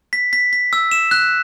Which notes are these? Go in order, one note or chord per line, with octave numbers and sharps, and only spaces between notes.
B6
B6
B6
E6
E7
F#6